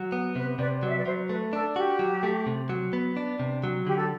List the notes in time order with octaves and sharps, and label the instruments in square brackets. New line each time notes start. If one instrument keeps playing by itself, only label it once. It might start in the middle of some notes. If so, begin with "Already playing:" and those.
Already playing: [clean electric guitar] F#3
B3
[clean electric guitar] C3 [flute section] B4
[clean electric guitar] C3 [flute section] B4 D5
[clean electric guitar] F#3 [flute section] D5
[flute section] E5
B4 D5
[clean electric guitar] F#3 [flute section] C5
[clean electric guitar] A3 [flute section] B4
[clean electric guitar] D4 [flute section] A4
[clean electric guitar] F#4 [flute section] G4
[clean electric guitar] F#3
A3
C3
F#3
B3
D4
C3
F#3
[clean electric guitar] D3 [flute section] G4
[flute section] A4